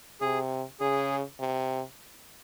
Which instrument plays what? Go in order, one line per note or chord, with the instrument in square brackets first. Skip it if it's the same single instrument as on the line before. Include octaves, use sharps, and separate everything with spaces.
[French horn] C3 [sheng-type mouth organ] G#4
[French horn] C#3 [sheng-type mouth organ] G#4
[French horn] C3